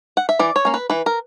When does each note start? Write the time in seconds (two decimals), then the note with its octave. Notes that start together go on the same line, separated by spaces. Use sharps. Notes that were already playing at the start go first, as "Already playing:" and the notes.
0.17 F#5
0.29 E5
0.39 E3 D5
0.56 C#5
0.65 A#3 C#4
0.74 B4
0.90 E3 B4
1.06 A#4